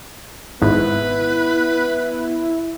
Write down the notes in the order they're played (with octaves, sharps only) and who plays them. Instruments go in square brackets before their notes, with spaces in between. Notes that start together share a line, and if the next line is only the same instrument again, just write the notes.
[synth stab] G#1 G#2 [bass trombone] B3 [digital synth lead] E4 [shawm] B4